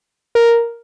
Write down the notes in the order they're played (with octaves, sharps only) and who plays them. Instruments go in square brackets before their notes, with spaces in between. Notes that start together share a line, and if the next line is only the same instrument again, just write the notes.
[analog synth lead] A#4